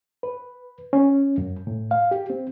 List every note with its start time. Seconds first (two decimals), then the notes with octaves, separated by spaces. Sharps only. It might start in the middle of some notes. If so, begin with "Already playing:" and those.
0.23 B4
0.93 C#4
1.38 F#2
1.67 A2
1.91 F5
2.11 G4
2.30 C4